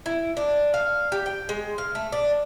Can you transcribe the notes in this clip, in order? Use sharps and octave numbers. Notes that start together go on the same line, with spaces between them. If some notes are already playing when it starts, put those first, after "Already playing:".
E4
D4
F5
G4
G5
G#3
F5
A3
D4